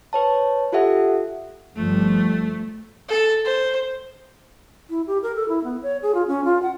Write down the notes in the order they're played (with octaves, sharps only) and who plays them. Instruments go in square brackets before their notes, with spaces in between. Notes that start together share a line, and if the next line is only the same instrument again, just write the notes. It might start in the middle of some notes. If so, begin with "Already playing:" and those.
[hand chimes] B4 C#5 A5
F4 G4 A4 E5 F#5
[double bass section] G1 F3 G3 [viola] A3
[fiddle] A4
C5
[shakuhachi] E4
G4
A#4
A4
E4
B3
C#5
G#4
F4
C#4
F4
F#5